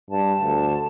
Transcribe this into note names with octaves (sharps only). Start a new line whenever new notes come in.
G2 A5
D2